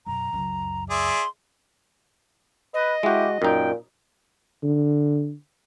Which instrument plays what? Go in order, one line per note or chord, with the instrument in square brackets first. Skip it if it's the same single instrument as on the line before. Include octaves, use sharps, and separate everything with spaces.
[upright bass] F#2 B2 [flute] A#5
[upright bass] C#2 F#2
[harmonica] G#4 D5 E5 [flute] C6
[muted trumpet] B4 [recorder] D#5
[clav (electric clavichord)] G#3 F#4 [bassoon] E4 [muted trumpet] G4
[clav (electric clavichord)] F#2 D#4 [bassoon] A#2 [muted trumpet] G5
[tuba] D3